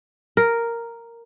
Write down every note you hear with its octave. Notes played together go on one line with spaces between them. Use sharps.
A#4